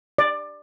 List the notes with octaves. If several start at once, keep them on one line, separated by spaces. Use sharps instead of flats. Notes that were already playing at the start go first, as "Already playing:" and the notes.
D5